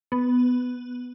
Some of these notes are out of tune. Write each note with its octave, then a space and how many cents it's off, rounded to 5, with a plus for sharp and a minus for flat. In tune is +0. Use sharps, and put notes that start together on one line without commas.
B3 +5